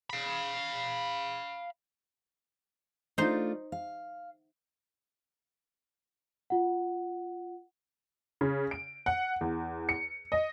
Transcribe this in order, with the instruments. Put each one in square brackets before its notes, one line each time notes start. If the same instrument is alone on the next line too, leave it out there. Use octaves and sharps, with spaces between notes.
[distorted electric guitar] F5 B5
[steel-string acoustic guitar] A3 D4 F4 [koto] D#4 C5
[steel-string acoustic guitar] F5
[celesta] F4 F#5
[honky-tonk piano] C#3
D7
F#5
E2
C#7
D#5